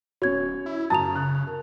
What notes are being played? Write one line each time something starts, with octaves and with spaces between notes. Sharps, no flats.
D1 C#4 F#4 C#5 G#6
E4
F#2 C#3 A5 A#5 D#6 A6 F7
F#6
A#4